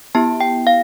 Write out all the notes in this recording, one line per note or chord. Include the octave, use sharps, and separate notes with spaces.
B3 E4 G4 A5
G5
F5